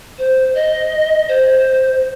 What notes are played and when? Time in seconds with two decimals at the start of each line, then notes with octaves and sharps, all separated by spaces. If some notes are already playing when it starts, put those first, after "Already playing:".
0.18 C5
0.55 D#5
1.28 C5